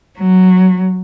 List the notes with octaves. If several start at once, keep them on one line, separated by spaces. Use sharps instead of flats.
F#3